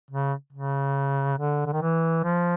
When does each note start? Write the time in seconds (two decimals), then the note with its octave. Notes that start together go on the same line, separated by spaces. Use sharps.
0.10 C#3
0.52 C#3
1.38 D3
1.66 D3
1.73 D#3
1.81 E3
2.23 F3